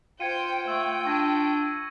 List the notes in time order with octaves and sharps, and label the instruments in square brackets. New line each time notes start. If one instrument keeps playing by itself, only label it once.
[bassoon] F4 [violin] C5 G5 [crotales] G#6 C#7 D#7
[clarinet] A3 [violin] G5 [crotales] E6
[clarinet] D4 [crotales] C#6 G#6 A#6